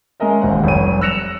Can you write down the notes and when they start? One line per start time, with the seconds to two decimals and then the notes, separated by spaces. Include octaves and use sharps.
0.20 G#3 C#4 A#4 D#5 E5
0.41 E1 D#2 G#2 C5 F#5
0.64 F1 B1 G3 C#5 D#7
1.01 E6 F#6 A#6 C#7 E7 F7